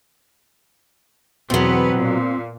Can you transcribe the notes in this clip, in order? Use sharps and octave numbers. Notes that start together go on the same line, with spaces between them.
E2 B2 F#3 B3 C4 B4
A#2